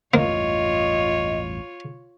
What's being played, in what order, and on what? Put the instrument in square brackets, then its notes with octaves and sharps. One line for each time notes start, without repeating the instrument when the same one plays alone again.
[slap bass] A1 E2 G2 [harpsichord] A#3 [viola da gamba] F4 C#5 [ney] D#5